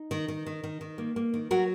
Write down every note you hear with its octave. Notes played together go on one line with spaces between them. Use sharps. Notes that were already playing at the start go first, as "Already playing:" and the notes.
Already playing: D#4
D#3
D#3
D#3
D#3
D#3
A#3
A#3
D#3
F#3 F#4 A#4